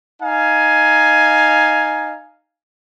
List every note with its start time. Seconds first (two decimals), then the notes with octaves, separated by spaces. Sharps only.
0.21 D#4 F5 G#5